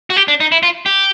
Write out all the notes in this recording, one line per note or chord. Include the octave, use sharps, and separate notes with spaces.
F#4
G4
D4
D#4
E4
F4
G4